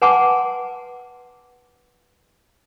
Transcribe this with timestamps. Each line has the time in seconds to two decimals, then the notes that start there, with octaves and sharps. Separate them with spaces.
0.02 B4 F#5 G#5 A5 C6 D6